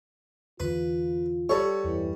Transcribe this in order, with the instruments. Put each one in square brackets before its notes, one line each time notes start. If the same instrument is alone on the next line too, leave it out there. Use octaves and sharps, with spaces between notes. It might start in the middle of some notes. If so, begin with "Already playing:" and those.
[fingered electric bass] E2 D3 E3 [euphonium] F4 [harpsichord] B4
[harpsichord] G3 C#6 [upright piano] A4 C#5
[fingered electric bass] E2 G2 [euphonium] E3